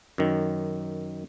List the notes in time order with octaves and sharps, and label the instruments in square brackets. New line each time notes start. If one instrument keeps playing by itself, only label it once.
[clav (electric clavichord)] F#2 D#3